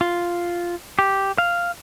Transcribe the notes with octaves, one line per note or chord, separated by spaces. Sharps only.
F4
G4
F5